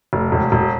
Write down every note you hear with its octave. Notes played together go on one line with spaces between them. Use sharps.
F1
E1
E1